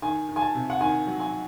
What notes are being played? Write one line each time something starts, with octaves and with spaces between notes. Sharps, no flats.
D#3 G#5
D#3
G#5
A5
C3
F#5
D#3 G#5
F#3
G#5